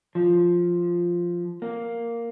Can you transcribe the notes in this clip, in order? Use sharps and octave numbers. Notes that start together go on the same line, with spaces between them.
F3
A#3